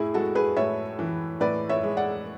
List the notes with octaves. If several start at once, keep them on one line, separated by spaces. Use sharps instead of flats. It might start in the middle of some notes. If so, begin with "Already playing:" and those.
Already playing: A2 E4 G#4
G#3 F#4 A4
G#4 B4
A2 C#5 E5
E3
A2 B4 D5
C#5 E5
G#3
D5 F#5